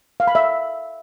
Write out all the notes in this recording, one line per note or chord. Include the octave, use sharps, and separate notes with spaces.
F5
B5
E5